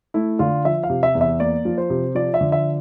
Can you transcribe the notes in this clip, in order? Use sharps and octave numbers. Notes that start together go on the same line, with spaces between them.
A3 E4
D3 F4
F3 E5
F5
C3
E5
E2
E5
A#3 D5
F3
C5
C3
F3 D5
E5
D3
E5